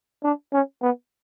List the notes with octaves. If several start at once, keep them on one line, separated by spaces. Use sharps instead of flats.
D4
C#4
B3